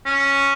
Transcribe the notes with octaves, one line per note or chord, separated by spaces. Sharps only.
C#4